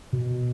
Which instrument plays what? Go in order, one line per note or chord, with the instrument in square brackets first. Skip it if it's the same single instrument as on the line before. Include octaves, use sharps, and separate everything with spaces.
[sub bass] B2